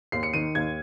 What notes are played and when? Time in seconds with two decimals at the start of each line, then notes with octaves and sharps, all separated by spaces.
0.12 D#2 C7
0.23 C#7
0.34 D#3 D#7
0.55 D#2 G#6